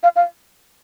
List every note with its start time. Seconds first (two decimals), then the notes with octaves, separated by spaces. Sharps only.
0.03 F5
0.16 F5